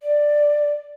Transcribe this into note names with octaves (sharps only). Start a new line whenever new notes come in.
D5